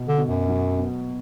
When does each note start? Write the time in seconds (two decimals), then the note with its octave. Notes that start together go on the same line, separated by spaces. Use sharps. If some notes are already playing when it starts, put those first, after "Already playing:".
Already playing: B2 B3
0.08 D3
0.18 B2
0.28 F#2
0.48 F#3
0.79 B3